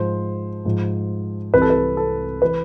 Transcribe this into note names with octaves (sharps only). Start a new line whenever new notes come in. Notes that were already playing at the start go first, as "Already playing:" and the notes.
Already playing: G#2 F3 C5
G#2 F3
C2 C3 E3 B4
A4
B4
A4
E3 B4